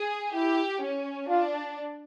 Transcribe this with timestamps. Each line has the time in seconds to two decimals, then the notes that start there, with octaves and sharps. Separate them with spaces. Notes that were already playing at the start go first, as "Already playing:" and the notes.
Already playing: G#4
0.34 E4 G4
0.82 C#4
1.29 D4 F4